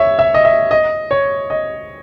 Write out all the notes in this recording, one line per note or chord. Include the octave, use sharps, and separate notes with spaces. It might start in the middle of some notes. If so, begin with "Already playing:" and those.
Already playing: C#5 E5
E5
D#5
E5
D#5
C#5
D#5